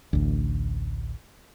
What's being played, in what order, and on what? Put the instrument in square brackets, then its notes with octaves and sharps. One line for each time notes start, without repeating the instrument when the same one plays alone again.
[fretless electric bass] A1 D2